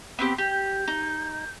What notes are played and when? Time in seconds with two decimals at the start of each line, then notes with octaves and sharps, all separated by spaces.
0.19 B3 C4 G4 B5
0.38 G4 G6
0.88 D#4